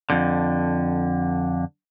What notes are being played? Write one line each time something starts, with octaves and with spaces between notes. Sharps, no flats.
F2 D3